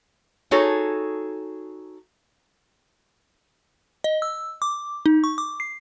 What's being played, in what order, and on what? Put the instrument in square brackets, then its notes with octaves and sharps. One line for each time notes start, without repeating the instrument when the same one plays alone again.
[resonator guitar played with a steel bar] D#4 F#4 G#4 A4 C#5
[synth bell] D#5
E6
D6
D#4
C#6
D6
C7